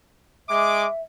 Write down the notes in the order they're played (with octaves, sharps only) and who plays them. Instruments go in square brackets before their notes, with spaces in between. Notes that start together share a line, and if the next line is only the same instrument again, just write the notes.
[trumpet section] G#3 D6 [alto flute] E5